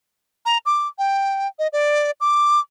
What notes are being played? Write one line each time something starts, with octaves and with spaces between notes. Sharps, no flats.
A#5
D6
G5
D#5
D5
D6